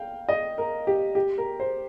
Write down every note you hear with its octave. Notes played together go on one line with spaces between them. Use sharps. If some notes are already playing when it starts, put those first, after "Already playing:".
Already playing: F5 G5
D#5
A#4
G4
G4
A#4
C5